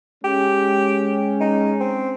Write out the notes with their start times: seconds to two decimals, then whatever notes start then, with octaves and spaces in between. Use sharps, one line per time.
0.24 G#3 C#4 G4
1.40 D#4
1.80 C4